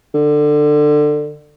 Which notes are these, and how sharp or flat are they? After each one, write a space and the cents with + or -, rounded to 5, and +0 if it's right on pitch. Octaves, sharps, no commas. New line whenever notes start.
D3 +20